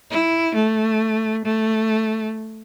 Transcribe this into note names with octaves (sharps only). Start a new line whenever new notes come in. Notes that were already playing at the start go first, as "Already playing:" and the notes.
E4
A3
A3